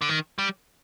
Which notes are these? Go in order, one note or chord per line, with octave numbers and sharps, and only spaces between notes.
D3
D#3
G3